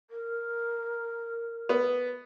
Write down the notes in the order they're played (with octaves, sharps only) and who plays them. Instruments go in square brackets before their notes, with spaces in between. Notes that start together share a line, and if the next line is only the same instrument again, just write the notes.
[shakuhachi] A#4
[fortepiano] B3